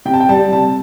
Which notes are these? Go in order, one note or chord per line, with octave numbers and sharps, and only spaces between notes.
C3 G5
A5
G5
G3 A5
C3 A5